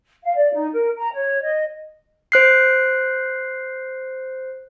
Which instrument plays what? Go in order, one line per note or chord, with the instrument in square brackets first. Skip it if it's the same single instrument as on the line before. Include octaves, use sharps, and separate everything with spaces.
[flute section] F5
D5
D#4
A#4
A#5
C#5
D#5
[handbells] C5 F#6 C7